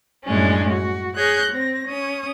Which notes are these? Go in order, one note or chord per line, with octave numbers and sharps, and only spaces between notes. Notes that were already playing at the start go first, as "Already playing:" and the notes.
F#2 A2 G3 G#3 C#4 D4
F#4
G#4 C#5 F#6 G6 A#6
C4 A#6
C#4 D#6